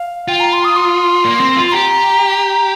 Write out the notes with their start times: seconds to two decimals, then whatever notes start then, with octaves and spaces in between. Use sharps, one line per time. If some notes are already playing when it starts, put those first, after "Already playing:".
Already playing: F5
0.28 F4 G5
0.40 A#5
0.53 C6
0.64 D#6
0.76 C6
1.25 A#3
1.40 C4
1.56 F4
1.68 C6
1.72 G4 A#5